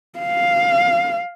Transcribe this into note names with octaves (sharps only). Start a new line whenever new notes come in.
F5